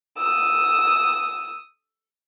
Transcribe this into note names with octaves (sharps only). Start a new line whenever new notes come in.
D#6 E6